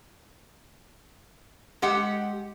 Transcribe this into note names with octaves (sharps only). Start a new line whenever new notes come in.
G#3 G4 F#5